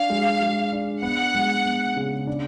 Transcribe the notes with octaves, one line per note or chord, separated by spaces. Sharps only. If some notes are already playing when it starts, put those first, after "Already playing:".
Already playing: D4 F5
G#3
G#3
D4
B3 F#5
G#3
B3
C#3
D4